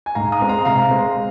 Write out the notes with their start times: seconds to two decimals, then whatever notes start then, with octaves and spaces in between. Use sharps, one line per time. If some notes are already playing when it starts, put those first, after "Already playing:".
0.06 G#5
0.15 G#2 F5 A#5
0.32 A#5 D#6
0.41 G#3 C4
0.49 F5 A#5
0.65 C3 F5 A#5
0.91 G#3 C4